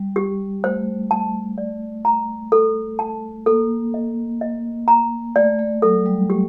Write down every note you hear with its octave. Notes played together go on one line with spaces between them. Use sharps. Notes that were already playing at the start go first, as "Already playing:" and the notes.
Already playing: G3
G4
A3 C5
A5
D5
A#5
A4
A5
A#3 A4
D#5
D#5
A#5
A3 D5
A3
F#3 A4
G3
A3 G4